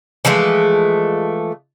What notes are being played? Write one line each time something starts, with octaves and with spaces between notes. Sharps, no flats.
E3 F3 G#3 A3